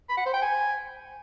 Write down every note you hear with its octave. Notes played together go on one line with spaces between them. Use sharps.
B5
F#5
C5
G5
G#5